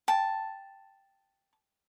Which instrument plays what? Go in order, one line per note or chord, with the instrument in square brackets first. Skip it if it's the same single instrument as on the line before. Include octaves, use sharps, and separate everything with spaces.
[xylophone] G5 [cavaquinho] A5